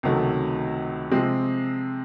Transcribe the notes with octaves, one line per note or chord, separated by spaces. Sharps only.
C#2 C3 D#3 F#3 A3
C3 F3 G#3 C4